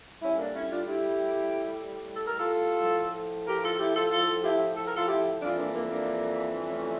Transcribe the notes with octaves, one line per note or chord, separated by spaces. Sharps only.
A2 G3 C#4 E4
A#3 D4
C#4 E4
D4 F4
E4 G4
A4
A#4
F4 A4
A2 F3
G4 A#4
F4 A4
E4 G4
F4 A4
F4 A4
F4
E4 G4
A4
A#4
F4 A4
E4 G4
F2 E3 G3 D4 F4
A#3 D4
A#3
A#3 D4
A3 C#4